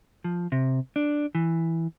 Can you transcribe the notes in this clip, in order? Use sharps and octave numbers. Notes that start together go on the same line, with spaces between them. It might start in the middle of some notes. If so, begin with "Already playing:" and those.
F3
C3
D4
E3